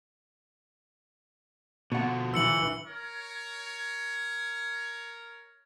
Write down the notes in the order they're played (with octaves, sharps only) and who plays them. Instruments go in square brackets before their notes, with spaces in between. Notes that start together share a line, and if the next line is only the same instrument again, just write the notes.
[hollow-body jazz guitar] B2 F#5 [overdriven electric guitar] D3 F3
[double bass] E3 [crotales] E6 C#7 F#7
[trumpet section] A#4 C#5